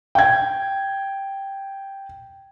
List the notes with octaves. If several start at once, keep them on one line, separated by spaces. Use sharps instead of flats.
G5 G#6